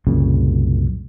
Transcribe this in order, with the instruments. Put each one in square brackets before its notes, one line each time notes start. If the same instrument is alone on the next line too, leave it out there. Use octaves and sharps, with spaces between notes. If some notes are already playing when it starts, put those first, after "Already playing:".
[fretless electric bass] C2 F#2 A#2 C#3